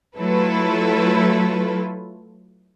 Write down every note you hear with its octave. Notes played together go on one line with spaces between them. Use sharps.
F#3 A3 E4 F4 A4 B4